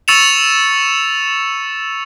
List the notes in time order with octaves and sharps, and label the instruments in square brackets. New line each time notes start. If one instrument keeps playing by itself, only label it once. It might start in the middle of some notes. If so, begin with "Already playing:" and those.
[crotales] C#6 E6 A6 C#7 E7 F7